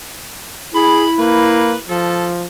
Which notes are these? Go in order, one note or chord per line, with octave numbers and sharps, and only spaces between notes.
E4 G#4 B5
A#3 B4
F3 A4